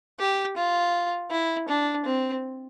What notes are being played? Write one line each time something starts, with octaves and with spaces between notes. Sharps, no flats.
G4
F4
E4
D4
C4